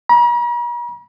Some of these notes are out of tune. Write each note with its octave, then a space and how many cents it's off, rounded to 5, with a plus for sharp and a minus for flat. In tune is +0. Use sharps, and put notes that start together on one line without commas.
A#5 +45